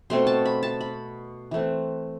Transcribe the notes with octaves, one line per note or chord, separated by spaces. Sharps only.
B2 A3 C4 C6
A5
B5
A5
B5
E3 A3 C4